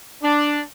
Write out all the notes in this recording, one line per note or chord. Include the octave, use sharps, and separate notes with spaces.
D4